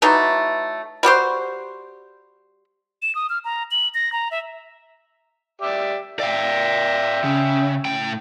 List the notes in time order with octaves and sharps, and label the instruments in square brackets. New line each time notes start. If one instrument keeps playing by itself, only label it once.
[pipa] E3 F#3 A3 D#4
G3 F#4 G4 C5
[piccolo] E7
D#6
F6
A#5
F#7
A#6
A#5
E5
[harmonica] G4 D5 E5
[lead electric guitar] D5 F5 [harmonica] E5 G5
[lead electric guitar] C#3
A2 G5